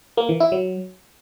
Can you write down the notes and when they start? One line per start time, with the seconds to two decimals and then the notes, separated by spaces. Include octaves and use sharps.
0.17 A#3
0.29 E3
0.40 E4
0.52 F#3